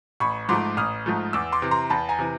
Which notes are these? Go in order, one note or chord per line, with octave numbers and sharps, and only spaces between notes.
A1 B5 C#6
G#2 F3 A3 C6 D6
A1 D#6 F6
G#2 F3 A3
E2 D6 E6
C6 D6
C3 E3
A#5 C6
E2 A5 B5
G#5 A#5
C3 E3